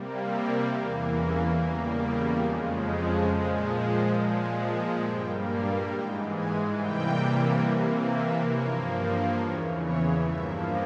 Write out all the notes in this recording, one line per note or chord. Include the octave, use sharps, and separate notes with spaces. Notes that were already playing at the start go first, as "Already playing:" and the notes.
Already playing: C3 G3 A#3
C4
E2 E3 A#3
C#4
E2 C#3 G3 A#3
E4
F2 C#3 F3 G#3 F4
A#2 F3 G#3
C5
A#2 F3 G#3
G2 G3 A#3 G5
F5
G#2 E3 G#3 G5
G#5
C3 E3 G3 A#3 G5
C3 E3 A#3
E5
G2 F3 A#3 C#5
C5
E2 C#3 E3 C#5
C#5
G2 F3 A#3 E5